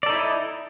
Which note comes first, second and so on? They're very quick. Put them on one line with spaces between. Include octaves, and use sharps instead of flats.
D5 A4 D#4 E4